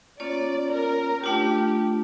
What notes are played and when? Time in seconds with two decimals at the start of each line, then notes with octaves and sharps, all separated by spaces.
0.20 A#3 C#4 F4 C#5 D5
0.72 A#4
1.24 A3 D4 F4 G4